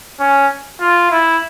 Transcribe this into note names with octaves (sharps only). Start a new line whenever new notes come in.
C#4
F4
E4